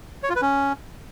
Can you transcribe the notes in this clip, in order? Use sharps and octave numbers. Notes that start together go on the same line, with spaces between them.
C#5
F4
B4
C#4